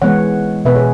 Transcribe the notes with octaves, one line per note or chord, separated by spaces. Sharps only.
E3 G#3 B3 C#5 F#5
B2 B3 B4 E5
G#4 C#5